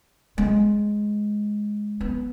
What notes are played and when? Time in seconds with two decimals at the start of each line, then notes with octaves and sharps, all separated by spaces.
0.38 G#3
2.01 B3